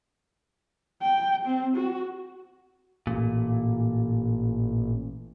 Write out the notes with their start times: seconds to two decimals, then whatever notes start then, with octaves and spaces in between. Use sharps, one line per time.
1.02 G5
1.46 C4
1.76 F#4
3.07 A1 A#2